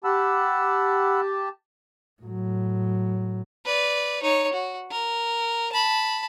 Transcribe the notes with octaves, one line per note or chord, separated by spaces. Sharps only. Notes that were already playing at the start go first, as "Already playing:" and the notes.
G4 F#5 A5 B5 E6
A2 F#3
B4 D5
D#4 C#5
F#4
A#4
A5 B5